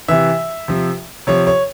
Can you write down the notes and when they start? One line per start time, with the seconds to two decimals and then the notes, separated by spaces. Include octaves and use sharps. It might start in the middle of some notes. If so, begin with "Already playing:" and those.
0.08 C3 E3 E5
0.68 C3 F3
1.27 C3 F3 C#5
1.47 C#5